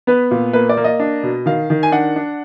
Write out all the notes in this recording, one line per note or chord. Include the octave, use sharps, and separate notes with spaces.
B3 B4
A#2
A#3 B4
D5
A#3
D#5
D4
B2
D#3 F5
D#3
G#5
D4 F#5
D4